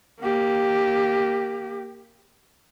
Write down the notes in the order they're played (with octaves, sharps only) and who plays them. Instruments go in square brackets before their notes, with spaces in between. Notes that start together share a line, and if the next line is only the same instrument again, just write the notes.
[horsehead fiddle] A#3 G4